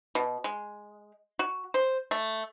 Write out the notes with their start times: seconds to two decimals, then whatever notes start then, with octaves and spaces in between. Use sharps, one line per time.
0.15 B2
0.44 G#3
1.39 F#4
1.74 C5
2.11 A3